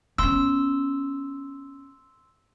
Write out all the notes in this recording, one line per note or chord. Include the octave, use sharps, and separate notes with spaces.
B3 C#4 C6 E6